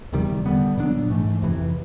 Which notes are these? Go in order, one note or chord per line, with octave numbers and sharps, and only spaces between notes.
E2 C3 D#3 G3
D3 G3 B3
A#2 F#3 B3 D4
G#2 E3 A3
F2 C3 E3